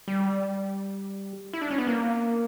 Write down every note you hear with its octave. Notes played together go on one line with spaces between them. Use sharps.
G3
E4
D4
C#4
B3
A#3